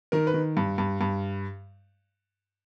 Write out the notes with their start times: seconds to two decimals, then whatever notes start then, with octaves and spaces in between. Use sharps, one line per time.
0.12 D#3 A#4
0.27 B4
0.34 D#3
0.57 G2
0.78 G2
1.01 G2